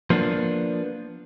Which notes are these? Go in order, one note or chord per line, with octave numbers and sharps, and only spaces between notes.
F3 A#3 B3 D4